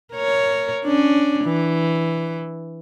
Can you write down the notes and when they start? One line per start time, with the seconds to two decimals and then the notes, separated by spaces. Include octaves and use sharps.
0.13 A#4 C#5
0.85 C#4 D4
1.44 E3